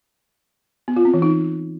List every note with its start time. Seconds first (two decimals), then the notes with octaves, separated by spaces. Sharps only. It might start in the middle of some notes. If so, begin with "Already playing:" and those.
0.88 B3
0.96 F4
1.05 C4
1.14 E3
1.22 D#4